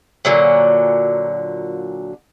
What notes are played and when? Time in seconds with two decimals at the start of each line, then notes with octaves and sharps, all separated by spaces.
0.25 A#2 D3 F#3